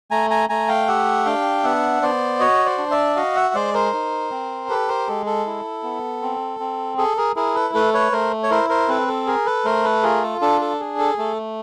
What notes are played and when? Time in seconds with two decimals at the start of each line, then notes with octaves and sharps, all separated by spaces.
0.11 A3 G#5 A#5
0.30 G#5 A#5
0.49 A3 G#5 A#5
0.68 F5 G5
0.87 G4 E5 F#5
1.25 D4 F5 G5
1.63 B3 E5 F#5
2.02 B3 C5 D5
2.40 F#4 C#5 D#5
2.65 C5 D5
2.78 D4
2.91 D5 E5
3.16 F#4 D#5 F5
3.36 E5 F#5
3.54 G#3 C5 D5
3.74 A#4 C5
3.93 D#4
4.31 C4
4.69 G4 A4 B4
4.88 A#4 C5
5.08 G#3 A4
5.26 A4
5.46 E4
5.83 B3
6.22 C4
6.60 C4
6.98 G#4 A4
7.17 G#4 A#4
7.36 E4 G#4 A#4
7.55 A4 B4
7.74 A3 A4 B4
7.94 B4 C#5
8.12 A3 A#4 C5
8.43 C#5
8.50 E4 A#4 C5
8.69 A#4 C5
8.88 C4 A4 B4
9.08 A4
9.27 G#4 A#4
9.46 A4 B4
9.65 A3 A#4 C5
9.84 A4 B4
10.03 F4 G#4 A#4
10.23 A4
10.41 D4 A4
10.61 A4
10.80 G#4
10.98 A4
11.18 A3 A4